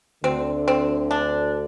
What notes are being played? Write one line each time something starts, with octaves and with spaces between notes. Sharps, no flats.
D2 D3 C4
C4
D4